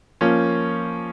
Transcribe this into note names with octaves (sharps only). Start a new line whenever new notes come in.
F3 A#3 C#4